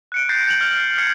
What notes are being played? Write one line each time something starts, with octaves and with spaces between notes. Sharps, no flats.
F#6 C#7 D7
F#6 G6 A6 A#6 C7 D7
G6 F7 F#7
F6 F7
F6 G#6 C7 C#7